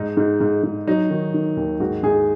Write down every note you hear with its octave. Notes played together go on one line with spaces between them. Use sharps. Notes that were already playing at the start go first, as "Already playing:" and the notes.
Already playing: G#2 D#4
G#2
G#2
G#2
F#3 D#4
D#3
D#3
D#2
G#2 F#4
G#2 G#4